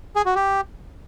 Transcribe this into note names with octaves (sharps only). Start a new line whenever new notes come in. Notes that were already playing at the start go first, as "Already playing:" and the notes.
G#4
F#4
G4